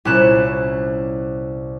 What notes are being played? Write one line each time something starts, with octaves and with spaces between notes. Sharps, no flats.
C2 A#2 C#4 E4 F#6 E7